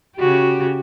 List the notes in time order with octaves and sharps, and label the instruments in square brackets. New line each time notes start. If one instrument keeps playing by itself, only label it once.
[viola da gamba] C#3 F#4 G4